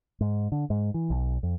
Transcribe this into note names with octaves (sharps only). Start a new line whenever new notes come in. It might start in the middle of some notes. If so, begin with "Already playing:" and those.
G#2
D3
G#2
E3
B1
F2